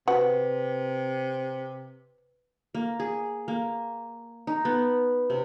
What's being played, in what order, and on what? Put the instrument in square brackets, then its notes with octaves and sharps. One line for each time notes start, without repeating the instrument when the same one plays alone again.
[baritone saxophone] C3 [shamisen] F#4 [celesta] B4
[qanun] A#3
G#4
A#3
D#4
B3
C3